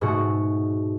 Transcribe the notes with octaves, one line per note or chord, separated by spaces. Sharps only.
G#2 B2 A3 F#4